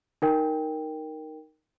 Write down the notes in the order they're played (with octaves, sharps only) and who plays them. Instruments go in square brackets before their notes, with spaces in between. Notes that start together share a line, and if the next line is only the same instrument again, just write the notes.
[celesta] D#4 A#4 G5